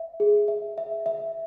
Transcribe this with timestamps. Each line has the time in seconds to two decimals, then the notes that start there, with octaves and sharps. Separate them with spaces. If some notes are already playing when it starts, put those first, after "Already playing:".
Already playing: E5
0.20 G#4
0.48 E5
0.78 E5
1.06 E5